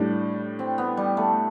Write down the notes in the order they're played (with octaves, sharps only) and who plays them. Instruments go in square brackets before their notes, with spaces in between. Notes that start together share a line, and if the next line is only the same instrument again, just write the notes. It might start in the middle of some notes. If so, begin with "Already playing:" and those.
Already playing: [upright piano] A2 G3 D4
[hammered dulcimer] C4
B3
G3
A3